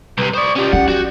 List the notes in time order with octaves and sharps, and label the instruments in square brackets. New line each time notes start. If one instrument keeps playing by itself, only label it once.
[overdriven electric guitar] C2 C3 [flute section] B4
[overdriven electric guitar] C5 D5 [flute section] B5 C#6 D#6
[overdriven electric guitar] C#4 F4 [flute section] G4 D5
[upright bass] C#4 [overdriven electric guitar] F#5
[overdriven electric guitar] F#4